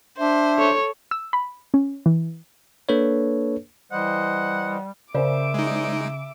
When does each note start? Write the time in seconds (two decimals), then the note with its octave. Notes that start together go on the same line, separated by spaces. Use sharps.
0.18 D4 C5 E5
0.59 A4 C#5
1.11 E6
1.33 B5
1.74 C#4
2.06 E3
2.89 A#3 D4 A4 B4 C#5
3.92 E3 G3 C5 D#5 F#5
5.14 C#3 A#4 C5 D5 E5 D6
5.54 G#3 D#4